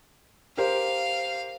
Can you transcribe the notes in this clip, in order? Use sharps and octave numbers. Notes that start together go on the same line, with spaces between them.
G4 A#4 C5 F5